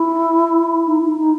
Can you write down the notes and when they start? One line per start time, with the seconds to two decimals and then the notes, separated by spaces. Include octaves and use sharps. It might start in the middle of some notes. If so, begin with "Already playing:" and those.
Already playing: E4
0.86 D#4
1.01 E4
1.17 D#4